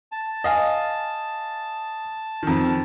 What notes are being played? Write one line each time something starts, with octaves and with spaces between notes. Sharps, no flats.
A5
D#5 F5 G#5
F2 D#3